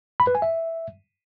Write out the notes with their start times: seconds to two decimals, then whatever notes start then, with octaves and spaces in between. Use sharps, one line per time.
0.20 B5
0.27 B4
0.35 G#5
0.42 E5